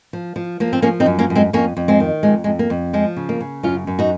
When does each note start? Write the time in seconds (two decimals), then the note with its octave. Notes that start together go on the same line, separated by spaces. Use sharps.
0.13 F3
0.36 F3
0.60 F3 A#3
0.73 C4
0.82 F3 A#3 C#4
1.00 C4 D#4
1.06 F#2
1.19 A#3 C#4
1.30 F#2
1.35 G#3 C4
1.53 F2 A#3 C#4
1.77 F2
1.88 G#3 C4
2.00 D#3
2.23 F2 G#3
2.44 F2 G#3
2.59 A#3
2.70 F2
2.93 F3 G#3
3.16 C#3
3.29 A#3
3.41 C#3
3.63 F#2 C#4 F4
3.87 F#2
3.99 D#4 F#4